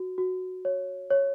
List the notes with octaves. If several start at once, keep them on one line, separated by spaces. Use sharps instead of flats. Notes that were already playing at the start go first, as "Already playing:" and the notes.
Already playing: F#4
F#4
C#5
C#5